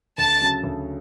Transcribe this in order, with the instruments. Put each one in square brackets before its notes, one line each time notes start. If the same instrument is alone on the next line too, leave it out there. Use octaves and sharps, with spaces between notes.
[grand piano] D2 [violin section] A5
[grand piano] C#3 F#3 C#4
D2